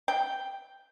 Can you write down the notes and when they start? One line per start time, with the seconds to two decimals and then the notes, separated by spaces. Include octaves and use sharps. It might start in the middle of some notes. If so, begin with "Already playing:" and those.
0.08 G5